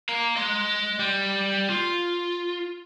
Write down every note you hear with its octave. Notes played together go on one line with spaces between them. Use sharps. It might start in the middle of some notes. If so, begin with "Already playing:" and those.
F5 A#5
D#5 C6
G3
F4